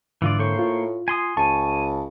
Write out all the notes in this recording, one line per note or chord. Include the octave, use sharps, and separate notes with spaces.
G#2 D3 E3 F4 D5
A2 A#3 C5 C#6
F4
G#5 C6 D#6
C#2 G#5 A5 C#6